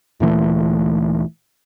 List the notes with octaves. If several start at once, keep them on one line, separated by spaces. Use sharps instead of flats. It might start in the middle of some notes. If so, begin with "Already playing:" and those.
D2 A#2 E3 A3